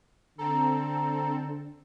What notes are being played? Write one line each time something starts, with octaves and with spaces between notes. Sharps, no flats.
D3 C4 A4 A#5